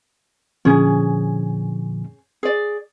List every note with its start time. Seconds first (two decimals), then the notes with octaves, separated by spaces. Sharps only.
0.65 A#2 D3 F3 C#4 G#4
2.43 G#4 D5